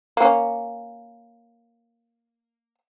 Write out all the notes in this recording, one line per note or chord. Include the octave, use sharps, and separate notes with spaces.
A#3 C#4